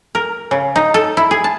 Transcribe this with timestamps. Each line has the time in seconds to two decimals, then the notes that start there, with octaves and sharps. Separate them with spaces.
0.15 A#4
0.51 C#3
0.76 D#4
0.94 A4
1.17 E4
1.31 G#4
1.44 A5